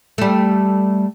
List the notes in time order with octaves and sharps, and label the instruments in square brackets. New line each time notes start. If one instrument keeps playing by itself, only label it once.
[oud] G3 A3